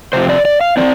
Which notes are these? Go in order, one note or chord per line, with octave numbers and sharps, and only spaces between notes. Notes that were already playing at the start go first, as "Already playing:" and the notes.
C3 F3 C4 C5
D5
D5
F5
F3 C4 D5